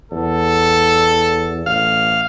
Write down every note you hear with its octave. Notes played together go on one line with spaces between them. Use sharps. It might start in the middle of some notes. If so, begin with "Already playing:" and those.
E2 A4
A1 F5